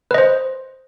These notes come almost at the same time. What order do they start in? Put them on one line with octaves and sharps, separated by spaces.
B4 D#5 C5